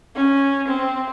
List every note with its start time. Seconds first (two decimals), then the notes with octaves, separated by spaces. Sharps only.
0.15 C#4
0.68 C4